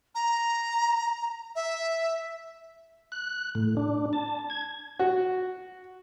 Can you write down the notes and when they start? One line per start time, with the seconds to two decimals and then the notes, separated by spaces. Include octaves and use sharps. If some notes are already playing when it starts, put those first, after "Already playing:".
0.15 A#5
1.56 E5
3.12 F#6
3.55 A2
3.77 D4
4.13 A5
4.50 G#6
4.99 F#4